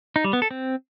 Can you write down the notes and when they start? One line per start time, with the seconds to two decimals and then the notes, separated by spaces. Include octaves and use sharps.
0.16 D#4
0.24 G3
0.33 B3
0.42 A4
0.51 C4